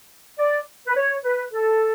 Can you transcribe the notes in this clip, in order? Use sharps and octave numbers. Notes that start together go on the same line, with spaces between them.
D5
B4
C#5
B4
A4